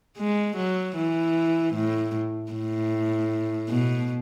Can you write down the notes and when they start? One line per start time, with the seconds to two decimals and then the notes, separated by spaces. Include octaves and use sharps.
0.17 G#3
0.56 F#3
0.96 E3
1.74 A2
2.52 A2
3.69 B2